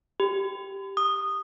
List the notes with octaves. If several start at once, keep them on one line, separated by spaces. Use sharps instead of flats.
G4
D#6